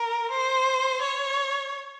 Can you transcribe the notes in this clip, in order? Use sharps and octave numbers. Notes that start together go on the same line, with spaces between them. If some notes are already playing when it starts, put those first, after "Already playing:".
Already playing: A#4
C5
C#5